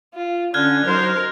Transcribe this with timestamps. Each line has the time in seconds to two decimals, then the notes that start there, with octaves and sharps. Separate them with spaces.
0.14 F4
0.54 D3 C#4 F6 F#6 G#6
0.86 F#3 D#4 A#4 C5